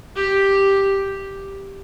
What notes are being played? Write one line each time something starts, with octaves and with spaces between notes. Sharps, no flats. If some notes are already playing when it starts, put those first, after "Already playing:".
G4